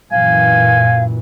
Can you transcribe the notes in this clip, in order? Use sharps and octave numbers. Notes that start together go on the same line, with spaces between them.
F#2 A#2 E3 F5 G#5